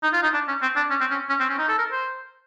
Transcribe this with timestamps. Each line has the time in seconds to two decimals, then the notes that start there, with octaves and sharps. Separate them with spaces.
0.03 D#4
0.13 F4
0.23 D#4
0.33 D4
0.48 C#4
0.62 C4
0.76 D4
0.90 C#4
1.00 C4
1.11 C#4
1.29 C#4
1.40 C4
1.49 C#4
1.59 D#4
1.69 A4
1.78 A#4
1.92 C5